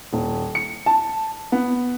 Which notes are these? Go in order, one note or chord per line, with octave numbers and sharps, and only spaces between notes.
D#1
C#7
A5
B3